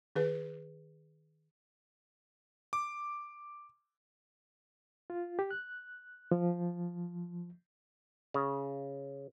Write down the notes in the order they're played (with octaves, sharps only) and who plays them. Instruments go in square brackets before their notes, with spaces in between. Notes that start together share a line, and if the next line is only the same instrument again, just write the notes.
[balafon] D#3 G#4 B4
[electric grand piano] D6
[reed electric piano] F4
G4
F#6
F3
[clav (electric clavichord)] C#3